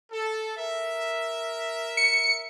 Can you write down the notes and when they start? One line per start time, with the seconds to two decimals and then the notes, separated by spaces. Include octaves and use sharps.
0.12 A4
0.58 A#4 E5
1.97 C#7